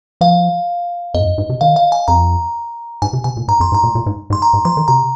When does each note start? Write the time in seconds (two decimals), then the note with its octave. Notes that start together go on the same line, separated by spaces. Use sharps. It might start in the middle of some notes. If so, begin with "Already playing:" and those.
0.21 F3 F5
1.14 F2 D#5
1.20 G#2
1.26 F2
1.38 G#2
1.49 C3
1.61 D#3 F5
1.76 F5
1.92 G#5
2.08 F2 A#5
3.02 G#2 G#5
3.13 C3
3.24 C3 G#5
3.37 A#2
3.48 G#2 A#5
3.60 F2 C6
3.72 G#2
3.74 A#5
3.83 A#2
3.95 A#2
4.06 G#2
4.30 G#2
4.33 C6
4.42 A#5
4.53 G#2
4.65 F3 C6
4.77 D#3
4.88 C3 A#5